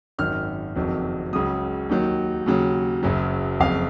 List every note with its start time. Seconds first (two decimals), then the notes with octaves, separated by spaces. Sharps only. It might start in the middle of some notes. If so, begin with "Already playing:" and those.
0.18 G#1 F#2 D#3 F6
0.76 F#1 F2 D#3 F#3
1.33 C#2 C#3 F#3 D#6
1.89 D#2 D#3 F#3
2.46 D#2 C#3 F#3
3.03 F#1 F#2 C#3 F#3
3.60 F#1 F2 C#3 F5